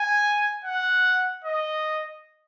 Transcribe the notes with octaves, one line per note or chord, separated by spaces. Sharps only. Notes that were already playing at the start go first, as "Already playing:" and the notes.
Already playing: G#5
F#5
D#5